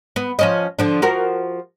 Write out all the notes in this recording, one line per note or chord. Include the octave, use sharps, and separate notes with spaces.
B3
F3 C#4 D#5
D3 F3 D4
F3 F#4 A#4